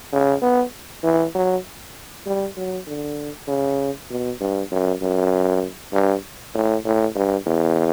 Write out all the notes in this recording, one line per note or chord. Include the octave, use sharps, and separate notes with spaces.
C#3
B3
E3
F#3
G3
F#3
D3
C#3
B2
G2
F#2
F#2
G2
A2
A2
G2
E2